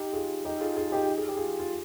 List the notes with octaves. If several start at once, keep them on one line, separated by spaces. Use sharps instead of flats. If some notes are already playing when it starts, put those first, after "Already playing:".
Already playing: D#4 G4
F4 G#4
D#4 G4
F4 G#4
F4 G#4
D#4 G4
G#4
G4
F4 G#4
F4